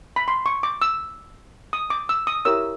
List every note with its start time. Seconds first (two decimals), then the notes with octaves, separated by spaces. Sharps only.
0.16 B5
0.28 C6
0.46 C#6
0.63 D6
0.82 E6
1.73 D#6
1.90 D6
2.09 E6
2.27 D#6
2.45 E4 G4 A#4 C#5 E6